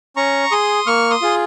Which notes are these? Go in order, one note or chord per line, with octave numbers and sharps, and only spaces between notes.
C#4 A#5 C#6
G#4 C6 D#6
A#3 C#6 F6
C6 D#6
F4 G#4